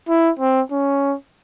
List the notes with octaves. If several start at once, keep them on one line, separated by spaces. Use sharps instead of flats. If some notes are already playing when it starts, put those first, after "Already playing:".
E4
C4
C#4